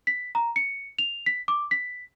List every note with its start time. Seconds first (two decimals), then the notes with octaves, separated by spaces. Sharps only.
0.07 B6
0.35 A#5
0.56 C#7
0.99 F7
1.26 B6
1.48 D6
1.71 B6